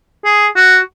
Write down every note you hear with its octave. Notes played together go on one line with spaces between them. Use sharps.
G#4
F#4